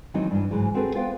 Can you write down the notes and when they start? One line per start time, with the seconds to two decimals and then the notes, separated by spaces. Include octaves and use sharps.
0.14 D#3 E3 F#3 A#3 C4 D#4
0.31 G2 E3
0.51 G#2 C#3 E3 F#3 G#3
0.74 C4 F#4 G#4 A4 B4
0.95 B3 F4 B4 C5 F5 G5